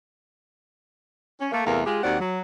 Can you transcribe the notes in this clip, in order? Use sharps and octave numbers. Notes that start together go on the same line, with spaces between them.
C#4
A3 A#3
E2 C3 A3 A#4 F5
G#3 F4 G4 G#4
D#2 C4 F#4 D5 F#5
F#3